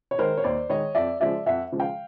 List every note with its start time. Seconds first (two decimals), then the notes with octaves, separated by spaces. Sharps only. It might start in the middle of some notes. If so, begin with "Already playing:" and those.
0.11 C#5
0.18 D#3 G#3 A#4 C5
0.37 C#5
0.44 D#2 C5 D5
0.70 D#3 G#3 C#5 D#5
0.95 F2 D5 E5
1.20 C#3 F3 G#3 D5 E5
1.46 F2 E5 F#5
1.72 C#3 F3 G#3
1.80 F5 G5